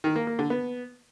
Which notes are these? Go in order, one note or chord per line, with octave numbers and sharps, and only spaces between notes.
D#3
A#3
A#3
D3
B3